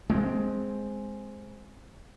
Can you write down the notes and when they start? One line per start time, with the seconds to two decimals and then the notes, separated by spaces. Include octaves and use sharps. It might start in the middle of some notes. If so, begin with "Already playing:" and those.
0.10 G#3 C4